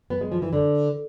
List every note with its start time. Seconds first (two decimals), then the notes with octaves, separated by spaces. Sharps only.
0.10 B3
0.21 G#3
0.32 F3
0.42 E3
0.53 D3